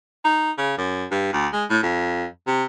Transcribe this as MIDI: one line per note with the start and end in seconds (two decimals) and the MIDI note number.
0.25 0.51 63
0.58 0.77 49
0.78 1.05 42
1.11 1.30 43
1.33 1.47 38
1.53 1.64 56
1.70 1.81 45
1.83 2.25 41
2.47 2.64 48